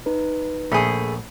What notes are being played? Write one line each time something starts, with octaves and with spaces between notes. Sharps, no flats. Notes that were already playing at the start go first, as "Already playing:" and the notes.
D#4 B4
A#1 A3 G#4 B5